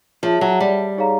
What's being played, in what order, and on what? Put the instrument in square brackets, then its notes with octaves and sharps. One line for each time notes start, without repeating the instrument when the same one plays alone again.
[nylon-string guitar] F3 [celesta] G#4 C#5 E5 A5
[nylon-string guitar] F#3
G3
[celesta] D#4 G#4 C#5 F5 A#5